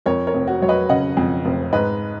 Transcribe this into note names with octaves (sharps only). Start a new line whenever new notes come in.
F2 A#4 C#5
A#4 C#5
F1
F#4
F#3 C#5
B4 D#5
C#3 D#5 F#5
F2
F1
G#2 B4 D#5